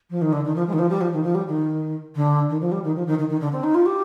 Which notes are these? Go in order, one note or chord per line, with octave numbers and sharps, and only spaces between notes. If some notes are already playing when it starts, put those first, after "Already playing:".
F3
D#3
D3
D#3
F3
G#3
D#3
F3
G3
F3
D#3
F3
G3
D#3
D3
D#3
F3
G3
D#3
F3
D#3
D#3
D#3
D3
C4
D#4
F4
G4